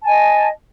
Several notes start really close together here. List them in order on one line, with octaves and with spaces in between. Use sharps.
A5 G#5 D#5